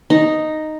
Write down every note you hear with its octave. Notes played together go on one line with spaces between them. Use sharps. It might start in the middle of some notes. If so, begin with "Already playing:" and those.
D#4